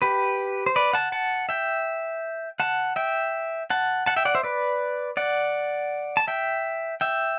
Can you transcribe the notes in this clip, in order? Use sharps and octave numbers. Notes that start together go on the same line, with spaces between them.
G4 B4
C5
B4 D5
F#5 A5
F#5 A5
E5 G5
F#5 A5
E5 G5
F#5 A5
F#5 A5
E5 G5
D5 F#5
C5 E5
B4 D5
D5 F#5
A5
E5 G5
E5 G5